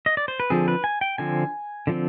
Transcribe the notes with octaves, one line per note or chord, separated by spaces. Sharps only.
D#5
D5
C5
B4
D3 F3 C4 G#4
B4
G#5
G5
D3 F3 C4 G#5
D3 F3 C4